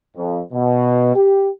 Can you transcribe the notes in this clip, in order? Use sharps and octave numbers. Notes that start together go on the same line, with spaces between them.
F2
B2
G4